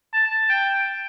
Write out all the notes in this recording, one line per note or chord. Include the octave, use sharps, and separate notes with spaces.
A5
G5